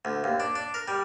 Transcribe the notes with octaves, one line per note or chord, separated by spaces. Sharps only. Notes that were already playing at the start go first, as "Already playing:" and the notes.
D2
D#2
D4
D4
A#4
G3